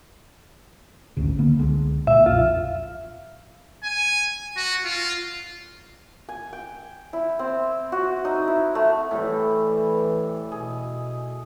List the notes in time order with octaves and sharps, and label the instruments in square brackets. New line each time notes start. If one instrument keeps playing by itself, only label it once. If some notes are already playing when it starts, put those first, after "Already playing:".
[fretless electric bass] G#1 D2 C#3
D3 A#3 B3
C#2 D3 G#3
[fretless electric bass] A#2 [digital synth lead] E5
[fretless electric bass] B1 F2 [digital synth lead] F4
[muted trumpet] G#5
F#4
F4
[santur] G#5
G5
E4
C4
F#4
D#4
E4
A3
[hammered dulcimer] A2 G3 [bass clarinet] E3
[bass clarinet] B2 [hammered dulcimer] G#4